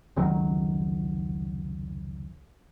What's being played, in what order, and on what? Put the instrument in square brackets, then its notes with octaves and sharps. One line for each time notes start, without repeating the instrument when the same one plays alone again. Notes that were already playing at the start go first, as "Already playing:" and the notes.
[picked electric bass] F1 C#2 D#3 F#3